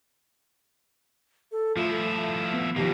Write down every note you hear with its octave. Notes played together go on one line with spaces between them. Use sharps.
A4
F3 A3 E4 F4
B3
B2 D#3 F3 A#3 G4